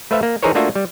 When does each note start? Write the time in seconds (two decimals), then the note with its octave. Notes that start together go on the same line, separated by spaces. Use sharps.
0.11 A3 B4 C5 E5 F5
0.23 A#3
0.43 E3 D#4 G#4 A#4 C5 C#5
0.55 A3 A#3 D4 F4 F#4 E5
0.76 G3